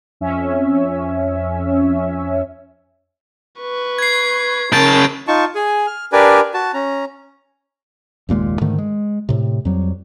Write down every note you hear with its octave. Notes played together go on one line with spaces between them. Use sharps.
F2 C#4 E5
B4 C#6
G#6 C7
C#3 C#4 A#4 A5 G6 D7
D#4 F4 A5 C#6
G#4 G#5
F6
D4 G4 A#4 B4 D5 G#5
F#4 A5
C#4 A#5
F#1 D#2 A#2 G#3
G#2 D3 D#3 A3
G#3
A2 C3
F2 F#3 G3